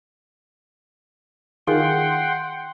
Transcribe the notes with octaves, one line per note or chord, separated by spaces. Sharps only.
D#3 F4 G#4 F#5 G5 C6